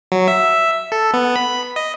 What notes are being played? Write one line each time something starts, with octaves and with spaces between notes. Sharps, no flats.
F#3
E5
A4
B3
B5
D#5